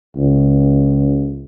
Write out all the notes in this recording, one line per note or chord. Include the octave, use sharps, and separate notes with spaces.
C#2